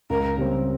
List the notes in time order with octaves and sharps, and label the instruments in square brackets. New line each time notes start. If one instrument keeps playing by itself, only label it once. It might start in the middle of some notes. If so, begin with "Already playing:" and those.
[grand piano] C#2 [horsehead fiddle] A#4
[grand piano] C#3 G3 C4